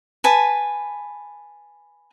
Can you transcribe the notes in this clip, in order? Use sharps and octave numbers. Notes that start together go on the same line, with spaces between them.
B4 G#5 A5